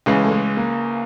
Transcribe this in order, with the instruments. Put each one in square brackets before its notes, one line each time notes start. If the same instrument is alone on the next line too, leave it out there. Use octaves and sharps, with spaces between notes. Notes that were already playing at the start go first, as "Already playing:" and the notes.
[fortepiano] C#2 C#3 E3 [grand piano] G#3
[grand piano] A3
G#3
A#3